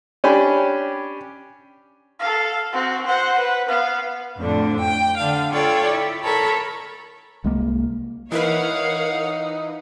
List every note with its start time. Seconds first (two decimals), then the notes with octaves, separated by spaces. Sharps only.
0.24 C#4 D4 G4 G#5 B5
2.19 A4 F5
2.72 C4 F#4
3.06 C5 F#5
3.38 B4
3.68 B3 F5
4.38 F2 A2 D3 D4
4.79 G5
5.17 D3 D4 F5
5.53 F4 A4 C#5 D5 G5
5.91 E4
6.23 A4 A#4 C#5 A5 B5
7.44 C2 G#3 A#3
8.32 E3 D#4 E4 A#4 B4 C#5 F5 F#5